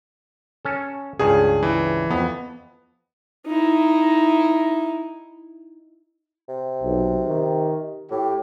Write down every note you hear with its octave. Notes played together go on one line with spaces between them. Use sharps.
C#4 A4
C#2 G2 C#3 G#4
E3
F2 B3
D#4 E4
C3
B1
D#3 G4
A2 G4